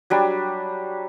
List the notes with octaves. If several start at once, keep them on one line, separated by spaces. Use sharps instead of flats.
F#3 G3 D4